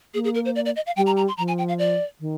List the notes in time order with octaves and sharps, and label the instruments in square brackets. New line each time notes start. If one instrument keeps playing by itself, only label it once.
[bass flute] A#3 [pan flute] G#4
[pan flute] G#4
A#4
C5
D5
D5
D#5
F5
[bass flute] G3 [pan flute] G5
[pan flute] A#5
A#5
C6
[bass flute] F3 [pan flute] A#5
[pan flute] G#5
G5
F5
D5
[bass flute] D#3